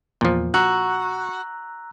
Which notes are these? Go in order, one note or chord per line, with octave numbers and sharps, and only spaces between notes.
E2 A#2 F3
F#4 A#5 E6 F#6